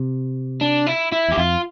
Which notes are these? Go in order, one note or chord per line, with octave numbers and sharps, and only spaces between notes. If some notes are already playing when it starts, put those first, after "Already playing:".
Already playing: C3
D4
E4
E4
E2 G4
F2 F4